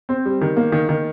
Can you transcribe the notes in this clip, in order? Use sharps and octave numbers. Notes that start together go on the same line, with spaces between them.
C4
G3
D#3
A#3
D#3
D#3